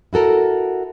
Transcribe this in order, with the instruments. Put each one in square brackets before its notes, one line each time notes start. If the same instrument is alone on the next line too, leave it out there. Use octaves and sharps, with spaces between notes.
[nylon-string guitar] E4 F#4 A4 A#4